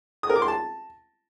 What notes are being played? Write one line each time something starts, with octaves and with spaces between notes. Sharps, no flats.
D#6
A#4
D6
C6
A5